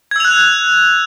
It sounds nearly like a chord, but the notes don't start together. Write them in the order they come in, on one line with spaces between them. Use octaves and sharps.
G#6 E6 F7 F#6